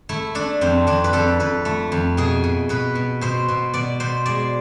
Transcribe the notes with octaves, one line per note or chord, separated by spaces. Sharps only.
A3 E4
A3 D4
F2 C4
F2 D4
B4
F2 A4
F2 B4
A3
F2
B2 G#4
B2
B2 B4
B2
B2 C5
B2
B2 D5
B2 C5
G#3 D5